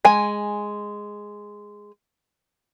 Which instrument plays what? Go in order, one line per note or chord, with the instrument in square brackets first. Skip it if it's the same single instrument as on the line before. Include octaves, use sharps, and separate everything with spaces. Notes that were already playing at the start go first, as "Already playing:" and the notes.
[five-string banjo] G#3 G#5